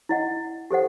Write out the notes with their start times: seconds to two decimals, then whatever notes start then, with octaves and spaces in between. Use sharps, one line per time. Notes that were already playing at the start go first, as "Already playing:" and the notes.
0.09 E4 D#5 F#5
0.71 G4 A4 C5 F#5